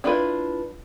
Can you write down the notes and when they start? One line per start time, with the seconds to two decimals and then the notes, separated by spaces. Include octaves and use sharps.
0.04 D4 E4 F4 A4 B4